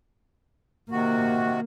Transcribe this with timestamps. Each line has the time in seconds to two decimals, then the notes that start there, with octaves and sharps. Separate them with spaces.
0.91 C3 D#3 A#3 F#4